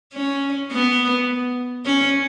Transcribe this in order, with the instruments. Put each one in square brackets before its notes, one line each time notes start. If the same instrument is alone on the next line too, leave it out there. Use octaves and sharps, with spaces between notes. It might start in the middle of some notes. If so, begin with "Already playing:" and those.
[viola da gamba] C#4
B3
C#4